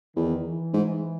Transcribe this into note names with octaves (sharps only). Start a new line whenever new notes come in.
E2 D#3
E3
G#2